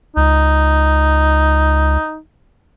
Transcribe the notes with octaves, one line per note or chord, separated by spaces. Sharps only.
C#2 D#4